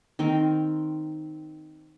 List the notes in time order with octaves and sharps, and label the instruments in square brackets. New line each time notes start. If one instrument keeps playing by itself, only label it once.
[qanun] D#3 C4 A#4